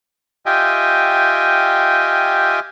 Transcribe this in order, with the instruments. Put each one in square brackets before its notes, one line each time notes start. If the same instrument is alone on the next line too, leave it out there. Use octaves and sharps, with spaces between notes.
[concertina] F4 G4 D#5 E5 G5 G#5